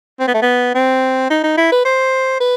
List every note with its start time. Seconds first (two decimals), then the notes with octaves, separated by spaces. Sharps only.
0.20 C4
0.28 B3
0.34 A3
0.42 B3
0.75 C4
1.30 D#4
1.44 D#4
1.57 E4
1.72 B4
1.85 C5
2.40 B4